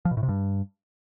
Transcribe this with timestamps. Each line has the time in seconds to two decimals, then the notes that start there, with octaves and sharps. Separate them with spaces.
0.05 F3
0.11 B2
0.17 A2
0.23 C3
0.29 G2